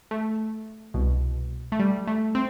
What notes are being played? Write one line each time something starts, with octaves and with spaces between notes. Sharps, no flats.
A3
C2 B2
A3
G3
A3
C4